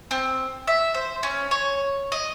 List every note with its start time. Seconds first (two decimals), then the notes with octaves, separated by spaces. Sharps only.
0.11 C4
0.67 E5
0.94 C5
1.23 C#4
1.51 C#5
2.12 D#5